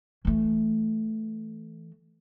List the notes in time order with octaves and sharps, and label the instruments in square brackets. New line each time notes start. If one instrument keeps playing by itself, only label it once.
[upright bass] E3 A3